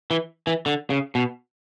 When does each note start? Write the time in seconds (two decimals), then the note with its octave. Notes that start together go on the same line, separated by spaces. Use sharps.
0.11 E3
0.47 E3
0.66 D3
0.90 C#3
1.15 B2